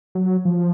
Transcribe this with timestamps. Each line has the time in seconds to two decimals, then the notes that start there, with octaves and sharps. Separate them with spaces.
0.15 F#3
0.45 F3